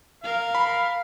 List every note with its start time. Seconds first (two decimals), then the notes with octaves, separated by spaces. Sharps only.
0.24 A#4 F5
0.55 B5